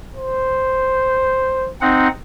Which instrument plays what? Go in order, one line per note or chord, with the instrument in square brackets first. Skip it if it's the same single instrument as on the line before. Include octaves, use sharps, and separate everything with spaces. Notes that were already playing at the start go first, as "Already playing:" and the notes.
[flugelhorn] C5
[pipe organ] C4 D#4 F#5